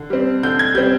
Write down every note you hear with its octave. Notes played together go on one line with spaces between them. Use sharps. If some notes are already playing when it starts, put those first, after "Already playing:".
Already playing: D3
G3 C4
D3 G6
G#6
G3 C4 G6